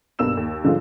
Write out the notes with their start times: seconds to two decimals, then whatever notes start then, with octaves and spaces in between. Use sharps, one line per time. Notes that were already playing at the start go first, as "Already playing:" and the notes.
0.19 B1 G2 A#3 B3 E6 E7
0.37 D#2
0.64 G#2 D3 F3 G3 G#3 F4